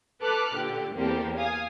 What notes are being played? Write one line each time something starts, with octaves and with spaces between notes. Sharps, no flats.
A4 B4 D6 F6 F#6
A#2 D3 G4
E2 A#3 C4 G4 A4
F5 G#5 D#6